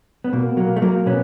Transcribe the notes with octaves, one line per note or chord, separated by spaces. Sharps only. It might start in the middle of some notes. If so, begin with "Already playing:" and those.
B3
B2 A#3
F#3 A#3
A3
F#3 A#3
B2 B3 C#4